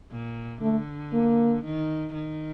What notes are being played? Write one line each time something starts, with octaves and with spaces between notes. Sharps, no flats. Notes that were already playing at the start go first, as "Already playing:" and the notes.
A#2
D3 A3
A#3
D#3
D#3